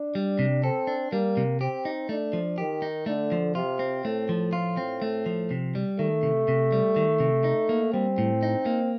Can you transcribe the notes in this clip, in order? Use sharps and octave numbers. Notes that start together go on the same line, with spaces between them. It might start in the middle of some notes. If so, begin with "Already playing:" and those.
Already playing: D4
G3
C3
C4 A4
D4
G3 A#3
C3
C4 G4
D#4
A3 D4
F3
D#3 G4
D#4
D3 A3
F3
C3 F4
C4
A2 A3
F3
A2 F4
C4
A3
F3
C3
G3
D#3 A3
C3
C3
G3
D#3
C3
D#4
A#3
G3 C4
A2
D#4
A#3